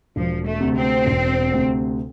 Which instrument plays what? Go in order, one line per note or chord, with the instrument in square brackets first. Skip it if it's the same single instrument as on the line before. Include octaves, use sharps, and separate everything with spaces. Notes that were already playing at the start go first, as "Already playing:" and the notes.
[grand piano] E1 [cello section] F3
[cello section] A3
[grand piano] D2 C3
[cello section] C4
[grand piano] E1
D2 C3